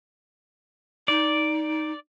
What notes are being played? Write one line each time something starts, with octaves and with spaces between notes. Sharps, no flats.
D#4 D5